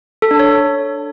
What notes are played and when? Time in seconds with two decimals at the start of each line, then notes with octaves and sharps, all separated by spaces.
0.22 A4
0.31 D4
0.39 C#5